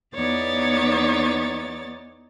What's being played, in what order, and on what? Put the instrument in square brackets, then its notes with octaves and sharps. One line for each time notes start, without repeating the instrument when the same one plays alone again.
[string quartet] E2 B3 D#4 C#5 D5 A6